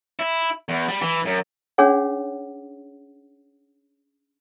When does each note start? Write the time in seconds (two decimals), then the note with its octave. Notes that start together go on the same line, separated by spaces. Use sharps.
0.19 E4
0.69 E2
0.89 G3
1.02 E3
1.25 F#2
1.78 C#4 D4 G#4 C#5 F#5